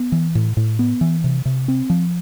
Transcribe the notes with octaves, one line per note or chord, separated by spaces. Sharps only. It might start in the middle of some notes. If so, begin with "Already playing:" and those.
Already playing: B3
E3
A2
A2
B3
E3
C3
C3
C4
F3